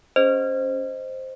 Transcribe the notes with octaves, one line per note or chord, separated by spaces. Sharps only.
C#4 G#4 C5 D#5